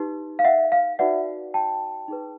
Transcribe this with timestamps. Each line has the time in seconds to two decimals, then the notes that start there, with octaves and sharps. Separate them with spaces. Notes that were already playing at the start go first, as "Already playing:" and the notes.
Already playing: D#4 G4 B4
0.39 F5
0.44 E5 F#5
0.72 F5
0.99 D#4 F#4 B4 D5 E5 F#5
1.54 G5 A5
2.08 D#4 G#4 B4